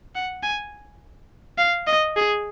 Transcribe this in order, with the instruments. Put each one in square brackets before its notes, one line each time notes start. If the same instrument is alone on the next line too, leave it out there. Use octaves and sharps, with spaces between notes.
[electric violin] F#5
G#5
F5
D#5
G#4